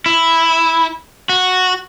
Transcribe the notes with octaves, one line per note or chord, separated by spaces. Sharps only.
E4
F#4